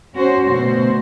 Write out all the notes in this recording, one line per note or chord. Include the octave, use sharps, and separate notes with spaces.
C#4 F#4 C5
D2 B2 F#4 C5